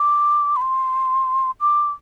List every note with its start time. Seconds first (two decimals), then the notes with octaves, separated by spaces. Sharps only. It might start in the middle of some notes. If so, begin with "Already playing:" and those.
Already playing: D6
0.56 B5
0.61 C6
1.61 D6